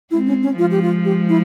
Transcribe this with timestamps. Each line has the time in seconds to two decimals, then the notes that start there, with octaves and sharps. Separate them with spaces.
0.11 G#3 C4 E4
0.27 C#4
0.43 C#4
0.58 F3 G#3 F4
0.71 G4
0.82 F4
1.05 G4
1.29 E4